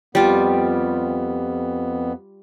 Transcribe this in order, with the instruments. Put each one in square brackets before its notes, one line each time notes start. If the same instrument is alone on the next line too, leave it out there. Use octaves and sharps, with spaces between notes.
[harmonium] F2 B3 [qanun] G3 F4